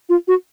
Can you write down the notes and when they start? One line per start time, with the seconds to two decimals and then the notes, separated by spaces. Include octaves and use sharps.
0.09 F4
0.28 F#4